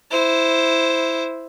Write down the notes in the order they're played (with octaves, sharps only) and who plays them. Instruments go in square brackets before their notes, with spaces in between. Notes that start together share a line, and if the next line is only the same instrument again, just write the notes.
[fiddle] E4 C5